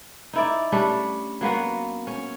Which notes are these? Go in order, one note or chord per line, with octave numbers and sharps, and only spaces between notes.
D#4 E4 D5
G3 A3 C#4 D4
F#3 A#3 B3 F#4
C#4